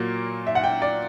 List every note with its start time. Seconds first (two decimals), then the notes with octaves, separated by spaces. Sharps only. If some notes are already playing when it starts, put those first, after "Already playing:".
Already playing: A#2 F#3 A#3
0.47 E5
0.55 F#5
0.64 G5
0.82 D5